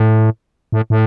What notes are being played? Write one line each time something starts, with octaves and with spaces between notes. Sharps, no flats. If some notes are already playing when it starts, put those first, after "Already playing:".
Already playing: A2
A2
A2